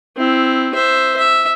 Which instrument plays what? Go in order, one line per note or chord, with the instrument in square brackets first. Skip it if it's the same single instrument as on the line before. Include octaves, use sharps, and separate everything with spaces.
[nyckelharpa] C4 E4
C5 E5
E5